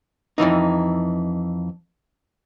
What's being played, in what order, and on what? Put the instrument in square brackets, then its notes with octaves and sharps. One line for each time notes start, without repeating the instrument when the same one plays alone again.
[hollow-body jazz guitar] F2 G#2 E3 D#4